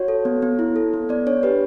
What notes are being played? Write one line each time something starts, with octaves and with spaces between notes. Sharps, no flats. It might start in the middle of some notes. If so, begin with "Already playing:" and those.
Already playing: F#4 C#5
A4
B3
B3
E4
A4
B3
B3 D5
D4 C#5
G4 B4